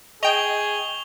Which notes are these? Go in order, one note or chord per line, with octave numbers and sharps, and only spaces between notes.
G#4 D#5 G5 C#6 F7 G7